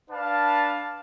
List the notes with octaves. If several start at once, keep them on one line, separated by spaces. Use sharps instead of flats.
D4 B4 F5 A5